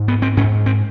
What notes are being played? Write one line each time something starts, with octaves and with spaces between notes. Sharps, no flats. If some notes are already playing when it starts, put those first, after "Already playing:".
Already playing: G#2
B3
C4
G#2 C#4
C4